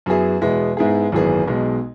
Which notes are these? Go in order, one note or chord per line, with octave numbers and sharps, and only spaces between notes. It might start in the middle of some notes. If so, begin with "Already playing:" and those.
F#2 F#3 B3 E4 G#4
E2 B2 G#3 B3 E4
G#2 G#3 B3 E4 G#4
G#1 F#2 E3 B3 G#4
B1 B2 G#3